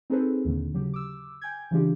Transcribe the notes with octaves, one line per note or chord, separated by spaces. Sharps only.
C4 D#4 G#4 A4 B4 C5
D#2 A#2 D3
C#3 F#3 G4
D6 E6
G5 G#5 G6 G#6
C#3 E3 G3 D4 F4 G4